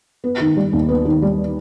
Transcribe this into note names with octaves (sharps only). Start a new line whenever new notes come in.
B3
D#3
G3
D#2
B3
D#3
G3